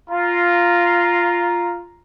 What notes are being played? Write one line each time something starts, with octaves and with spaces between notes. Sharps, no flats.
F4 A#5